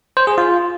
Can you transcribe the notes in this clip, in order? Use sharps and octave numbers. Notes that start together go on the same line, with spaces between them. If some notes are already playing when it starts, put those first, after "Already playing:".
C5
G#4
F4